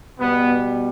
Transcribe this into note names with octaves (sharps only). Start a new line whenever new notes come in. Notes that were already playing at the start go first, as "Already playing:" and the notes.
B2 G3 B3